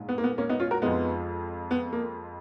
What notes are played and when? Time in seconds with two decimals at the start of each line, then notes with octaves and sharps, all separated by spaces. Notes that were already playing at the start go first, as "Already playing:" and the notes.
Already playing: A#1 G#2
0.09 B3
0.18 A#3
0.24 B3
0.38 A#3 C#4
0.49 B3 D#4
0.60 C#4 F4
0.71 F#4 A#4
0.82 F2 F3 G#3 B3 D#4
1.71 B3
1.93 A#3